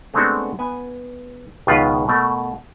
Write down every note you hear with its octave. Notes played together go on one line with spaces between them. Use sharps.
G#3 A3 B3 C4 D4 F#4
B3 G#5
C#2 B2 D#3 B3 F4 B4
B2 A3 A#4